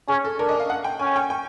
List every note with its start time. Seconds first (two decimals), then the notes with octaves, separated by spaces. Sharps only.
0.08 C#4 G#4
0.24 A4
0.39 D4 A#4
0.49 D#5
0.60 F5
0.70 F#5
0.84 G5
0.99 C#4 G#5
1.16 G5
1.30 G5